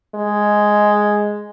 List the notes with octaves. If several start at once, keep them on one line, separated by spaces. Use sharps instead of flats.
G#3